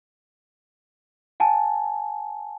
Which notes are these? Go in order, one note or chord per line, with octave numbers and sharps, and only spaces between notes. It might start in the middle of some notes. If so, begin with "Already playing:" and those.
F#5 G#5 A5